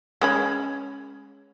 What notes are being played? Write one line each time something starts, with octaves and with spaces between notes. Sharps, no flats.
G#3 C#4 B5